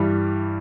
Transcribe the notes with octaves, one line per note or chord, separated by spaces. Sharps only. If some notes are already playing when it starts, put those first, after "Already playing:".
Already playing: G2 E3 G3